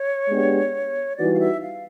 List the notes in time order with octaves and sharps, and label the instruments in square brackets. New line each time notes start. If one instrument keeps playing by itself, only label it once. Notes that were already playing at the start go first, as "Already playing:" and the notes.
Already playing: [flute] C#5
[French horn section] G#3 B3 D4 G4
[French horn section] E3 G3 B3 D#4 F#4 [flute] D5
[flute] F5
E5
F5